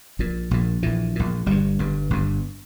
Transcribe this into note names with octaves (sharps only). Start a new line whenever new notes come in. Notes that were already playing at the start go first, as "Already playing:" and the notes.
A#1 A#2
A#1 A#2
A#1 A#2 E3
A#1 A#2
G1 G2 G3
G1 G2
G1 G2